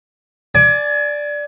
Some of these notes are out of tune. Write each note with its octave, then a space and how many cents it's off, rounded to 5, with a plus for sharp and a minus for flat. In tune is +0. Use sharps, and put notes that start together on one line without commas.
D5 +0 G#5 +30